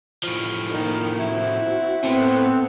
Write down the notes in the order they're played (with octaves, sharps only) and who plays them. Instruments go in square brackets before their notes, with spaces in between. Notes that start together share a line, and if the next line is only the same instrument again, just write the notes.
[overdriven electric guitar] A2 F3
[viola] D#3 A#3
[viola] C4 F#4 [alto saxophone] E4
[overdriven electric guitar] A2 [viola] B3 A4 [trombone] C4